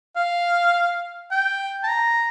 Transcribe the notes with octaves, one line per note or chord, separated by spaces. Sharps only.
F5
G5
A5
A#5